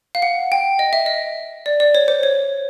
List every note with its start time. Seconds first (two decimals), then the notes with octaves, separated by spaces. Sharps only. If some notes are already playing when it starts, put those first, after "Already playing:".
0.15 F5
0.22 F#5
0.52 G5
0.79 D#5
0.93 E5
1.06 D#5
1.66 D5
1.80 D5
1.95 C#5
2.08 C5
2.23 C#5